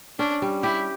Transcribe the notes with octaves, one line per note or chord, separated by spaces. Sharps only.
C#4 D4
G3
E4 G4